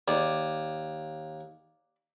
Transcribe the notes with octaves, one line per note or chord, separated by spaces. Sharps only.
D#2 D5